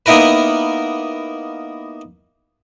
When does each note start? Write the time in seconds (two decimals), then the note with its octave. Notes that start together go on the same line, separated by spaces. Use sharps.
0.06 A#3 B3 D#4 E4 A#4 B4